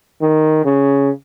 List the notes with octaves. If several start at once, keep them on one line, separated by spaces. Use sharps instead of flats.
D#3
C#3